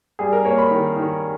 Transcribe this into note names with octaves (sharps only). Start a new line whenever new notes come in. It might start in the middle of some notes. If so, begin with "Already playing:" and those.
G3 G#4
A#4
A#3 C#5
B5
D#3
D#3